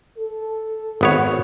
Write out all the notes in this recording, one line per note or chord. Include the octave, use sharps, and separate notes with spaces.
A4
G#1 B3 C#5